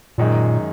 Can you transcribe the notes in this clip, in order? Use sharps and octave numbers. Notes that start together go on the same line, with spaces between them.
F#2 A#2 D#3 G#3 D#4